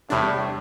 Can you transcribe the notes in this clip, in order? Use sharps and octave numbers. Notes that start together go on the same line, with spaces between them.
E2 A2 C3 G3 D4